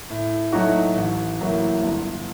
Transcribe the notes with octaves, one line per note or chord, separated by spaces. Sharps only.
A2
F#3 A3 D#4 F#4
A1
A2 F#3 A#3
G1